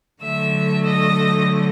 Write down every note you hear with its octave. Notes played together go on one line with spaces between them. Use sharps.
D3 F#3 A3 E5
D#5